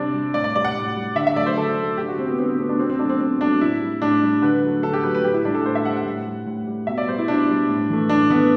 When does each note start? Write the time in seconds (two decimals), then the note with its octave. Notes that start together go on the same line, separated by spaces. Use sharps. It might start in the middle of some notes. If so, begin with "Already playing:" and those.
Already playing: C3 G3 C4 D4 D5
0.14 G3
0.34 A2 D5
0.44 D5
0.55 G3 D5
0.65 F#5
0.75 A2
0.96 G3
1.16 D3 E5
1.27 E5
1.36 F#3 A3 D5
1.46 C5
1.57 D3 A4
1.78 F#3 A3
1.98 D3 G4
2.08 F#4
2.18 A3 C4
2.28 B3
2.38 D3 C4
2.49 B3
2.59 A3 C4
2.69 D4
2.79 B2 C4
2.90 C4
2.99 F#3 A3 D4
3.10 C4
3.20 B2 C4
3.40 F#3 A3 D4
3.60 A2 E4
3.81 G3
4.02 A2 D4
4.23 G3
4.42 D3 B4
4.63 F#3 A3
4.83 D3 A4
4.93 G4
5.03 F#3 A3 B4
5.15 B4
5.24 A2 G4
5.34 E4
5.45 G3 D4
5.55 A4
5.65 A2 C5
5.75 E5
5.85 G3 F#5
5.96 F#5
6.06 A2
6.26 G3
6.46 A2
6.67 G3
6.87 B2 E5
6.98 D5
7.07 G3 C5
7.18 E4
7.28 B2 D4
7.49 G3
7.69 A2
7.90 E3 A3
8.09 A2 D4
8.30 E3 A3 B3